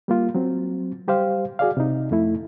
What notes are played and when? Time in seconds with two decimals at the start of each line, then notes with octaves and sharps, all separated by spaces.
0.08 G3 A#3 F4
0.35 F#3 C4
1.07 G3 G4 C5 F5
1.59 F#4 G#4 D5 F5
1.77 C3 D#4
2.11 F2 A3 E4